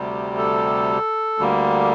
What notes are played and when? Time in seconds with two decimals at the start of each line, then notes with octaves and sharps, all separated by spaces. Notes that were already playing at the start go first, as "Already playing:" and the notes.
Already playing: D2 C3 G3
0.38 A4
1.39 D2 D3 G3 A#3